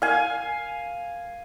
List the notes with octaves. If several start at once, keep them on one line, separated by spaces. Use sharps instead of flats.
F5 G#5